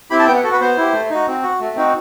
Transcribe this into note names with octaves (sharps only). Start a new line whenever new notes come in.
C4 E4 G4 B5
A5
B3 G5
F#5
F#4 A4
B4
B3 C5
E4 G4
A3
D#4 F#4
C4
F#4
A3
C4 D#4 F#4